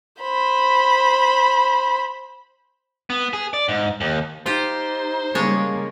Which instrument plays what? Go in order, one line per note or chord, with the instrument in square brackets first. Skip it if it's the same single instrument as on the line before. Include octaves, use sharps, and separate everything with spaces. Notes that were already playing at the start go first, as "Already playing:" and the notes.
[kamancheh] C5 B5
[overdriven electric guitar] B3
G#4
D5
G#2
D#2
[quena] D#4 [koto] F4 G4 [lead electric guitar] C5
[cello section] C#3 G3 A#3 [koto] G#3 C#5 A5